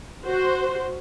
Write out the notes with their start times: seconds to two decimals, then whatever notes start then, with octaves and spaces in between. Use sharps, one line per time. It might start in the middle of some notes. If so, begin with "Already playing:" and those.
0.24 F#4 C5